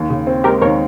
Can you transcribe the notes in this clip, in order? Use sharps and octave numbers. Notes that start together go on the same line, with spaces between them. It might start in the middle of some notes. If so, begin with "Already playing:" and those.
Already playing: D#2
C#3
C4
G#3 G4 A#4
D#2 A#4 C#5